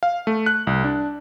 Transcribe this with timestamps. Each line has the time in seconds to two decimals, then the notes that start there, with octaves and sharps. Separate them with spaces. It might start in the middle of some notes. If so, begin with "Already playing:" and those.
0.03 F5
0.27 A3
0.46 F#6
0.67 C2
0.84 D4